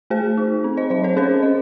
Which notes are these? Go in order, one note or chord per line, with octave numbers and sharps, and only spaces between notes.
A3 G#4 C5
D#4
C4
C5 D#5
F#3 C5 D#5
A4 C#5
C#4 G#4 C5
C#4 D#5